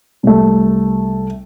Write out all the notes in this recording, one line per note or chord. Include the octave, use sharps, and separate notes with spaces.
C2 A3